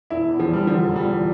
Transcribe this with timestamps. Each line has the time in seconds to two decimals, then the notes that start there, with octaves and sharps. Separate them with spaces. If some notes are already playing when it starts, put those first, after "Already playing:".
0.10 E1 E4
0.29 E2
0.40 F3
0.49 E1 G3
0.67 D3 F3
0.86 E1
0.96 G3
1.05 E2